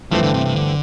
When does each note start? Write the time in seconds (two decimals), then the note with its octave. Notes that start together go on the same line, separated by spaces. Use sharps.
0.11 G2 E3 F3 A3 C4
0.23 D3
0.34 C3
0.46 C3
0.56 D3